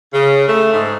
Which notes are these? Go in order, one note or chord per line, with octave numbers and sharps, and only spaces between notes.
C#3
A3
G#2